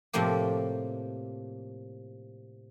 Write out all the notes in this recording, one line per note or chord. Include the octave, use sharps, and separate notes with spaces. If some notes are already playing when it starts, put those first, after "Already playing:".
A2 C3 F3 A#3 G4